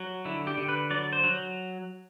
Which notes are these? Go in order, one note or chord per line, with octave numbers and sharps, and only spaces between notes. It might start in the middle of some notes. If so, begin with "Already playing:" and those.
Already playing: F#3
D3 E4
G4
D3
B4
F#3 D5
C5
F#3